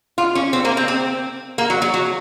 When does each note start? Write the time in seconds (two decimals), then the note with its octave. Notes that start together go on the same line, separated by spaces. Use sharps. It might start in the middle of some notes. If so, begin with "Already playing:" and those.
0.18 F4
0.35 C#4
0.53 C4
0.65 A#3
0.77 C4
0.88 C4
1.58 A#3
1.70 F#3
1.82 F#3
1.94 F#3